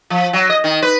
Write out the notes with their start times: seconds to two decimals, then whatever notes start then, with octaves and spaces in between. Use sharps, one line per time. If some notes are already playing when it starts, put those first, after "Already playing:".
0.10 F3
0.33 F#3
0.50 D#5
0.64 D#3
0.82 B4